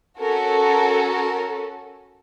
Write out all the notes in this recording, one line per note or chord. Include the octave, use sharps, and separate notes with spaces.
C#4 F#4 A4 A#4
A#4
A#4